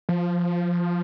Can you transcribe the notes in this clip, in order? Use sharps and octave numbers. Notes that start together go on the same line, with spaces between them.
F3